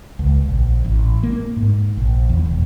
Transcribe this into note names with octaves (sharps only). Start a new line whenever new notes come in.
C#2
A#1
A1
A#3
G#2
A#1
E2
E1